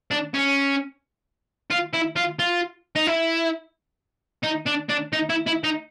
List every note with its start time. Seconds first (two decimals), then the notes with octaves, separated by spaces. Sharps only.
0.11 D4
0.34 C#4
1.71 F4
1.94 E4
2.16 F4
2.39 F4
2.96 D#4
3.07 E4
4.44 D#4
4.67 D4
4.90 D4
5.13 D#4
5.29 E4
5.46 E4
5.64 D#4